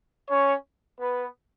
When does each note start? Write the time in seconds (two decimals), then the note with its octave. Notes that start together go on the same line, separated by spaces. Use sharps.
0.28 C#4 C#5
1.00 B3 B4